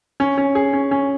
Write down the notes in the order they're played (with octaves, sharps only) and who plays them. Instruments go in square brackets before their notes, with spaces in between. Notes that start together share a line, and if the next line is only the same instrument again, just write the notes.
[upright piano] C#4
C#4
G#4
C#4
C#4